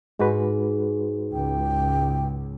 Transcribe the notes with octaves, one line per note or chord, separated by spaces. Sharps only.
G#2 G#3 F#4 B4
C#2 G5